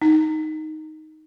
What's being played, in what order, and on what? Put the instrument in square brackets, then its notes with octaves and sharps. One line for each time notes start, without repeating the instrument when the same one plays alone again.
[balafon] D#4